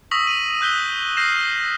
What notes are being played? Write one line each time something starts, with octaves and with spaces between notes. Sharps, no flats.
C#6 D#6 E6 A#6 B6 F#7
D#7 F#7
E6 F#6 G6 B6 G7
F6 G6 A#6 C7 E7